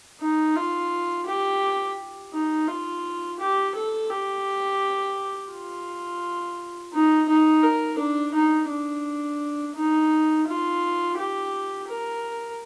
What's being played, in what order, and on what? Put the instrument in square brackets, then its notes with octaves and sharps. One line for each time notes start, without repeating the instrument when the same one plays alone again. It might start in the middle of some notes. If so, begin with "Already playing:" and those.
[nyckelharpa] D#4
F4
G4
D#4
F4
G4
A4
G4
F4
D#4
D#4
A#4
D4
D#4
D4
D#4
F4
G4
A#4